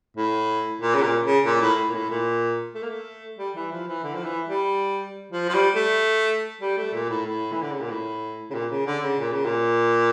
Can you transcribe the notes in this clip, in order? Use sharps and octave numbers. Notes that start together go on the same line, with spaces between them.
A2
A#2
C#3
A#2
C#3
A#2
A2
A#2
A2
A#2
A3
A#3
A3
G3
E3
F3
E3
D3
F3
E3
G3
F3
F3
G3
A3
G3
A3
A#2
A2
A2
E3
D3
C#3
A#2
A2
C#3
A#2
C#3
D3
C#3
A#2
C#3
A#2